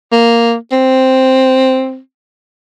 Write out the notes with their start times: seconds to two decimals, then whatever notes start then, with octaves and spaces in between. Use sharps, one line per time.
0.12 A#3
0.72 C4